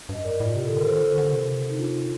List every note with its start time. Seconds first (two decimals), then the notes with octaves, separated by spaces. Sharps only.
0.09 G2 D#5
0.24 A#4 D5
0.40 A2
0.45 F4
0.56 C3 G4
0.65 A4
0.71 D3
0.76 A#4
0.86 D#3 A4 C5
1.02 D3
1.18 D3
1.33 C3
1.70 D#4
1.79 D4 F4